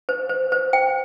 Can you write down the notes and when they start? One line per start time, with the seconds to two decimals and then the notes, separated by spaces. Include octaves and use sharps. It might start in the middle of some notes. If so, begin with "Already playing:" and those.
0.09 C5
0.29 C5
0.52 C5
0.73 G5